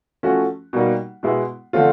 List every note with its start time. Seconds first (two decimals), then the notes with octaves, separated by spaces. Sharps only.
0.23 F3 A3 C#4 F#4
0.73 B2 G3 A#3 D#4
1.23 B2 G#3 B3 E4
1.73 D3 F3 A3 C4 F4